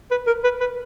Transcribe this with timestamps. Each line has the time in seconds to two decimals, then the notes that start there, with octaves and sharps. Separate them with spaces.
0.11 B4
0.27 A#4
0.44 B4
0.60 B4